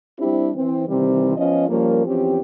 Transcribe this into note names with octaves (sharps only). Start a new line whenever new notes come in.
G3 C4 D4 E4 G4
E3 C4
C3 D#3 E3 G3 C4
F3 B3 C#4 F4 D#5
F3 G3 A#3 C#4 A#4
E2 F3 C4 C#4 G4